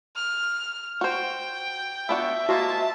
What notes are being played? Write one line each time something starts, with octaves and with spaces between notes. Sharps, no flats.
F6
F#4 C5 G5
B3 D4 F#4 E5
F3 G#3 A#3 F#4 A5